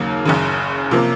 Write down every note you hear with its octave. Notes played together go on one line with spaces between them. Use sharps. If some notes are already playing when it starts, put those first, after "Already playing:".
Already playing: D#2 C#3 F#3 A#3
F#1 F#2 C#3
C3 F3 A#3